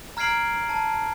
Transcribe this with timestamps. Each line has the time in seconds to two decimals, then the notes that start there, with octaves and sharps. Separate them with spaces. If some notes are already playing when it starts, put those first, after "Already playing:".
0.17 A#5 F6 G#6 C7 D7 F#7
0.69 A5